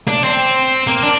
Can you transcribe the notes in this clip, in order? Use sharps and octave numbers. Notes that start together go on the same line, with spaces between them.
D4
C4
A#3
D4